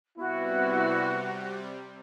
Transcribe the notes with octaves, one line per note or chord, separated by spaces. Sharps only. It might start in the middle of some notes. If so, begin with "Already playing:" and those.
C3 G3 B3 E4 F#4